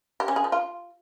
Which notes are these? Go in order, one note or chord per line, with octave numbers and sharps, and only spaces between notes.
G4
C#4
G#4
F3
F4